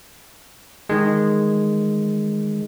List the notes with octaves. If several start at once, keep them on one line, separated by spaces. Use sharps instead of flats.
D#3 G#3